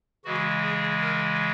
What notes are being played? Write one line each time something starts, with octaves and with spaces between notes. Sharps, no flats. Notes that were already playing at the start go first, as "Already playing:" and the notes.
C#3 E3 G#3 F#4
G#4
A#4